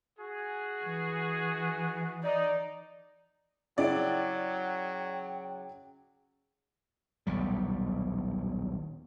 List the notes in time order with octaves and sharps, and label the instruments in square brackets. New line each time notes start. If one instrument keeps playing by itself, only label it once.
[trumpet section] F#4 G#4
[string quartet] E3
[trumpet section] D#4 [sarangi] D5
[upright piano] C#3 E4 D7 [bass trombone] F#3 [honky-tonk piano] D5 [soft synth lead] G5
[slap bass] D#1 B1 G3